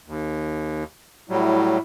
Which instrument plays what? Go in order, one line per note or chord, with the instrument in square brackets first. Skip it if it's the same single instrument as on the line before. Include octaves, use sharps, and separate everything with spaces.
[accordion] D#2
[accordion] A2 F#3 G3 [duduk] E4